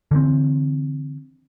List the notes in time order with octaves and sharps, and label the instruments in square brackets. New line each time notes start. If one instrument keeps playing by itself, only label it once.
[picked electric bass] D3 E3 A#3 C4